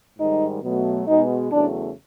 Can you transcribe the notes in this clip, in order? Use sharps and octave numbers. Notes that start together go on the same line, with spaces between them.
G#2 D#3 G3 D#4
B2 F#3 A3
B2 G#3 D#4
E2 C#3 F#3 A3 D4